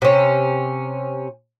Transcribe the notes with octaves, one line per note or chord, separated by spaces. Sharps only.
C3 C#4